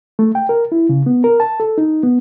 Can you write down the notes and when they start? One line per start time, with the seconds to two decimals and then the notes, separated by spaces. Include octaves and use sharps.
0.19 A3
0.35 G5
0.49 A#4
0.72 E4
0.89 C#3
1.06 B3
1.24 A#4
1.40 A5
1.60 A4
1.78 D#4
2.03 B3